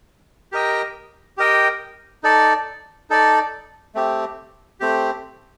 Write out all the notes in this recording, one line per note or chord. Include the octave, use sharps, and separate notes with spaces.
G4 A#4 D#5 G5
G4 A#4 D#5 G5
D#4 A4 D5
D#4 A4 D5
A3 C4 G4
A3 C4 G4